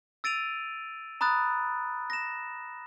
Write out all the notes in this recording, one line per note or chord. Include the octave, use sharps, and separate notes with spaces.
E6 A6 D7 D#7 F7
A#5 B5 D#6 F#6 A6
A#6 E7